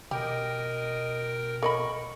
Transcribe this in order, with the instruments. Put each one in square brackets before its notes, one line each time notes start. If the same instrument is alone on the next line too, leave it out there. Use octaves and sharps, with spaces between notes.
[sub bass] B2 [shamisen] G4 [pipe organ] A#4 G5 [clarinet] D#5
[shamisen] A#4 D#5 B5 [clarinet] C#6